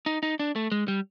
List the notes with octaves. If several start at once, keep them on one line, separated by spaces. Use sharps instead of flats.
D#4
D#4
D4
A3
G#3
G3